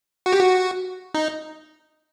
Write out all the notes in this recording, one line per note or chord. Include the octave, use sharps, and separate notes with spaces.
F#4
G4
F#4
D#4